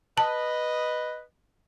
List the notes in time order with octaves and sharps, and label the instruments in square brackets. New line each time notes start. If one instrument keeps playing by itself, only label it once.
[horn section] B4 D#5 [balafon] A5